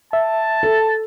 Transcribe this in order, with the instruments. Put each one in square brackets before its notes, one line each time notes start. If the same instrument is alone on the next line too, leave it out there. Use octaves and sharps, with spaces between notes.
[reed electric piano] E5 [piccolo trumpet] A5
[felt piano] A4